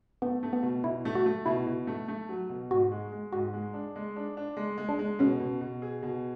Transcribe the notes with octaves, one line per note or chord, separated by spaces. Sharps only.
A3 B3
A3
B3
B2
B2 E4
A3
F#4
A3
B2 E4
B2
A3
A3
F#3
B2
G#2 F#4
G#3
G#3
G#2 F#4
G#3
D4
G#3
D4
D4
G#3
G#3
D4
G#3
B2 C#4
B2
B2
G#4
B2